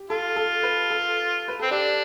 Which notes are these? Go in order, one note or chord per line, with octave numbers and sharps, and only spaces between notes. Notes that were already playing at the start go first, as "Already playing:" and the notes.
Already playing: G4
F4 A4
A4
B4
A4
B4
C4 A4
D4 G4